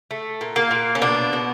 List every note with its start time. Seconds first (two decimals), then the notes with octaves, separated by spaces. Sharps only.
0.11 A3
0.41 A#2
0.56 A#3
0.71 A#2
0.95 C#4
1.02 B2 D4
1.33 B2